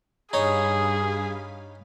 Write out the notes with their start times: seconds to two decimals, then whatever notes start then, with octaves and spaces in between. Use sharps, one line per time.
0.33 G2 D#4 G#4 C#5 F5 B5